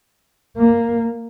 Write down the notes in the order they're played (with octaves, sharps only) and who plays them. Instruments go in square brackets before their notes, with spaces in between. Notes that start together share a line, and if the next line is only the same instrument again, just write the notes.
[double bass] A#3